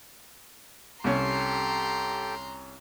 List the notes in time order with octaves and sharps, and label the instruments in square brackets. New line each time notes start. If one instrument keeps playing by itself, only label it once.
[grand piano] C2 C#4 [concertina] G4 A4 G5 [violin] A#5 C6